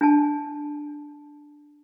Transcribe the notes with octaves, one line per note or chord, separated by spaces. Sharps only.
D4 G#5 A5